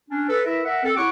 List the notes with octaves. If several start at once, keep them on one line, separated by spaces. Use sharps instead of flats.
C#4 D4
A4 B4
E4 A#4 B4 E5
A#4 E5 F#5
C4 A4
E4 G4 C#5 F#5 C#6 D6